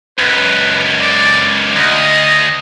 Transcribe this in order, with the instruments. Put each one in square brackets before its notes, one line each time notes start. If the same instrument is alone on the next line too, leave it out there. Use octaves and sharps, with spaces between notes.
[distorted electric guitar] C#2 F#2 [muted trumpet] B4
[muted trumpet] D5
[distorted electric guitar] D2 [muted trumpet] D#5